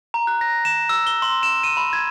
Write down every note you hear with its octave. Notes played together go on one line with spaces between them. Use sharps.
A#5
F#6
A#6
E7
E6
G7
C6
E7
D#7
B5
G#6